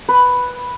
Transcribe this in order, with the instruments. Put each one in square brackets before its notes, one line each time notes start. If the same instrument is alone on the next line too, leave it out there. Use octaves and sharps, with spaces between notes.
[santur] B4